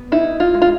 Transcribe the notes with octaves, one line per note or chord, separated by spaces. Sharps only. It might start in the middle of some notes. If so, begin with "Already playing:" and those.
Already playing: B3
D#4 E4
F4
G#3
F4